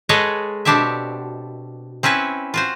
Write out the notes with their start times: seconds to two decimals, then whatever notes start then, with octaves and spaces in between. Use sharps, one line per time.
0.09 G#3 G#4 A4 B4 C#5 D#5
0.65 B2 C4 D4 G4 C#5 E5
2.03 C4 C#4 E4 B4 C#5
2.54 F4 F#4 C5